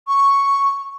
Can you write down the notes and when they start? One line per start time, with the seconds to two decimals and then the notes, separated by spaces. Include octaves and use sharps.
0.08 C#6